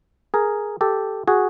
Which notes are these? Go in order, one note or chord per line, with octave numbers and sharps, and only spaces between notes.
G#4 A#4
G4 A4
F#4 G#4